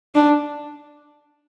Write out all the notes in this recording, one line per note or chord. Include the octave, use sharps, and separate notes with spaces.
D4